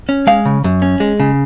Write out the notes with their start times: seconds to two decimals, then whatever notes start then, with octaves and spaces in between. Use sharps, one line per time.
0.09 C#4
0.27 G#3 F5
0.45 C#3
0.64 F#2
0.82 C#4
1.00 G#3
1.20 C#3